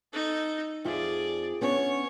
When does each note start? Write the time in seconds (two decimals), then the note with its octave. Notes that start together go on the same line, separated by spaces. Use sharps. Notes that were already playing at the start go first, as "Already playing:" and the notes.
0.13 D#4 A4
0.85 F2 F4 G#4 D5 E5
1.61 B3 C#4 D4 C#5